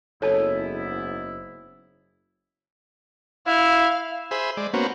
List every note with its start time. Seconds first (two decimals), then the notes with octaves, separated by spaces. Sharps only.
0.22 F#1 G#2 B3 E4 A4 C#5 A5
3.47 E4 F5
4.31 G#4 C5 E5 B5
4.57 G#3 D5
4.74 A#3 B3 C#4 F#4 C5